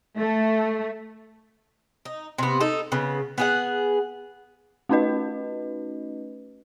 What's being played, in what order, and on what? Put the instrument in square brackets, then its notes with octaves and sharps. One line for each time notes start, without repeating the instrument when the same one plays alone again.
[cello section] A3
[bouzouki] D#4
C3 B3
D#4 A4
C#3 B3
B3 G#4 F#5
[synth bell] A3 C#4 D#4 F#4 B4 D#5